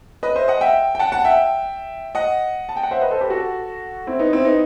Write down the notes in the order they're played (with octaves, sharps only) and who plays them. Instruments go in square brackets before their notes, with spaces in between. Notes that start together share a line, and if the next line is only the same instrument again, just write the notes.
[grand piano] B4 D#5
C5 E5
D#5 F#5
E5 G5
G5
F#5 A5
F#5 A5
E5 G5
D#5 F#5
A5
G5
F#5
C5 E5
B4 D#5
A4 C5
G4 B4
F#4 A4
C4 E4
B3 D#4
C4 E4
B3 D#4